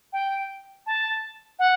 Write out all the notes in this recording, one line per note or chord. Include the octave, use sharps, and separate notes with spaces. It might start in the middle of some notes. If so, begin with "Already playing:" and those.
G5
A5
F#5